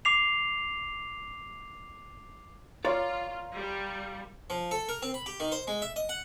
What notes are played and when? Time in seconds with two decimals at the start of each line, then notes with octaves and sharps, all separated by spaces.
0.05 D6 C7 F7
2.85 F4 A#4 C#5 D5 F5 C6
3.54 G3
4.50 F3
4.71 A4
4.89 A#4
5.02 C4
5.14 B5
5.26 G4
5.40 D#3
5.52 C5
5.67 G#3
5.82 E5
5.96 D#5
6.09 F#5